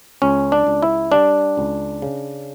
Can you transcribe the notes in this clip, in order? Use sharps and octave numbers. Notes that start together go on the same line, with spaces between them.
C#2 C#4
D4
C#2
E4
G3 D4
C#2
C#3